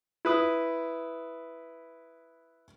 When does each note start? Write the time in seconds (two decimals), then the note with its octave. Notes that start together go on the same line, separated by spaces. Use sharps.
0.25 E4 B4 D#6